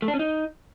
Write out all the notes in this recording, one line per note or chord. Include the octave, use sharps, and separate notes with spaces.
A3
D4
C#4
D#4